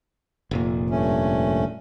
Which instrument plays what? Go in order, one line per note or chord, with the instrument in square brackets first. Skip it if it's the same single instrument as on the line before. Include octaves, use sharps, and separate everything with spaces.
[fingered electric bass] F1 A#2
[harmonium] G2 A3 C#4